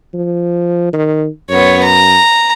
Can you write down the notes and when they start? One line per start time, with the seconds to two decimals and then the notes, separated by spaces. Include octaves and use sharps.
0.14 F3
0.93 D#3
1.50 F#2 B3 C#5
1.83 A#5